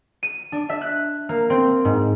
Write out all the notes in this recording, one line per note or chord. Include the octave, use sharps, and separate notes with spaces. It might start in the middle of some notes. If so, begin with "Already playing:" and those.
D#7
D4
E5
F#6
A#3
C4
G#2